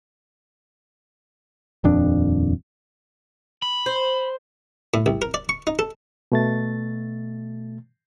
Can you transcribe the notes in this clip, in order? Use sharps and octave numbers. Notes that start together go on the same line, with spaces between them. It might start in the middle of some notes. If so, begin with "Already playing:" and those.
D#1 F2 D4
B5
C5
A2
C2
A#4
D5
C#6
D#4
A4
B2 A3 A6